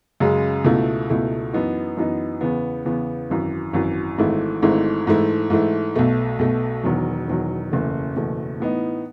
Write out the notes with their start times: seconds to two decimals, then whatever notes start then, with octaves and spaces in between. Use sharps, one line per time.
0.20 F#2 C#3 G#3
0.65 C#2 B2 A3 E4
1.09 C#2 B2 A3 E4
1.53 F#2 E3 B3 D#4
1.97 F#2 E3 B3 D#4
2.41 E2 C#3 E3 B3
2.85 E2 C#3 E3 B3
3.30 G#1 F#2 E3
3.73 G#1 F#2 E3
4.18 G#1 G#2 E3 A3 E4
4.62 G#1 G#2 E3 A3 E4
5.07 G#2 E3 A3 E4
5.50 G#2 E3 A3 E4
5.96 B1 B2 A3
6.39 B1 B2 A3
6.83 E1 E2 D#3 F#3
7.27 E1 E2 D#3 F#3
7.72 F#1 E2 B2 A3
8.16 F#1 E2 B2 A3
8.60 A2 E3 B3 D#4